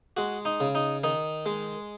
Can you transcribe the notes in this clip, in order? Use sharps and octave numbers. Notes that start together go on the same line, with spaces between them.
G#3 F#4
D#4
C#3
D#4
D#3 D#4
G#3